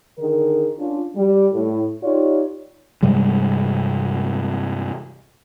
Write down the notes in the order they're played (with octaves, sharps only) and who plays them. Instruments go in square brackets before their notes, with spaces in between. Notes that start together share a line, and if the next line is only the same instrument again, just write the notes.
[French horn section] D3 D#3 G#4 A#4
C#4 D4 F4
G3
A2
D#4 F4 G4 C#5 D5
[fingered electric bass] G2 C3 G3 G#3